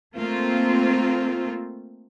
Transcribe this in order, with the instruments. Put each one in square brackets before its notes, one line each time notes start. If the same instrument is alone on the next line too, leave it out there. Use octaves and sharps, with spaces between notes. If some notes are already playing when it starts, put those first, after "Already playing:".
[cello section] A3 A#3 C4 F4